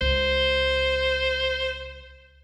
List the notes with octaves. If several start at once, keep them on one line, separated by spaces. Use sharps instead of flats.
C#2 C5